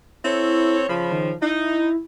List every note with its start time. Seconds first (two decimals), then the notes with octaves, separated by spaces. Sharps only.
0.24 C4 E4 A4 C#5
0.89 C#3 F3 B5
1.12 D#3
1.42 D#4 E4